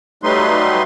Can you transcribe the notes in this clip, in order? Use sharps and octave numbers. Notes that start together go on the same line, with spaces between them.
F#3 G3 A3 D#4 B4 C6